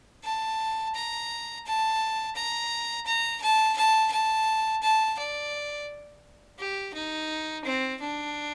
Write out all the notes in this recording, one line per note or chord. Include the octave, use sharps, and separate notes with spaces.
A5
A#5
A5
A#5
A#5
A5
A5
A5
A5
D5
G4
D#4
C4
D4